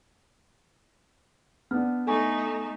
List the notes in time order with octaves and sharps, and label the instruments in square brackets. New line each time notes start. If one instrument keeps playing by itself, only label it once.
[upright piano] B3 D4 [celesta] F6
[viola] A3 D#4 [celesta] A4 G#5 C#6